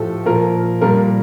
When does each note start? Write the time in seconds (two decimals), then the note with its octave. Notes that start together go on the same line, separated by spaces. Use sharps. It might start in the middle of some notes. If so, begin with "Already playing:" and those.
Already playing: A2 F3 G4 A4
0.26 A#2 F3 A#4
0.81 A#2 G3 A#4